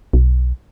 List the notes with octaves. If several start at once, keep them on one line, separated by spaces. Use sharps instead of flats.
B1